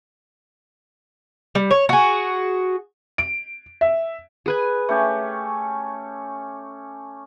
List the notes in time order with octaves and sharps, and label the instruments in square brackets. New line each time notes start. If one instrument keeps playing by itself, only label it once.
[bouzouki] G3
C#5
F#4 G#4
[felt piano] D7
E5
[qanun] G#4 B4 G#5
[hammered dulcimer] A3 C#4 G4